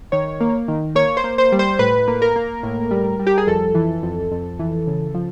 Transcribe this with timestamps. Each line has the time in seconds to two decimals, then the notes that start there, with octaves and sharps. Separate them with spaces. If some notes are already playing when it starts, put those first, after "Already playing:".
0.12 D#3 C#5
0.40 A#3
0.68 D#3
0.95 A#3 C#5
1.17 C5
1.24 A#3
1.38 C5
1.52 G3
1.59 C5
1.79 A2 B4
2.08 A#3
2.22 A#4
2.36 A#3
2.63 A2
2.91 G3
3.19 G3
3.27 G4
3.38 G#4
3.47 F2 A4
3.75 E3
4.03 F2
4.31 F2
4.59 E3
4.87 C#3
5.14 F3